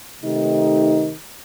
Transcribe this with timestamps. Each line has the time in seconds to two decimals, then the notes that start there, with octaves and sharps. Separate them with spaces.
0.21 C3 D#3 A3 D#4 G4